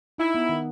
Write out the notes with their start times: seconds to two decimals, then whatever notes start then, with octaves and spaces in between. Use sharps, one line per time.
0.18 D#4 E4
0.35 B3
0.49 D#3